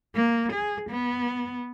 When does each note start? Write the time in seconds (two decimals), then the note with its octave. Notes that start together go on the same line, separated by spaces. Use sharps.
0.15 A#3
0.52 G#4
0.90 B3